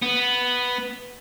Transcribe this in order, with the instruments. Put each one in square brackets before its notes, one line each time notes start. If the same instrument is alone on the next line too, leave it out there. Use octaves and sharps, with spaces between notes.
[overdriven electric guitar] B3